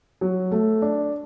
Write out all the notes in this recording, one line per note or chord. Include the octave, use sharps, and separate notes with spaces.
F#3
A3
D4